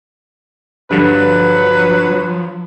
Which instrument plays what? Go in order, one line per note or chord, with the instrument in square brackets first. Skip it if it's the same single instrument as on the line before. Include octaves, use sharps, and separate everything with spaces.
[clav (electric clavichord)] G2 D3 [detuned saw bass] F3 [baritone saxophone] F#3 [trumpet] B4